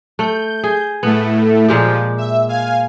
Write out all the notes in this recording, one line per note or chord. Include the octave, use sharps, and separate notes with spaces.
A3 G6
G#4
A2 A3 B3
A#2 F3 G#3 G4
E5
F5 G#5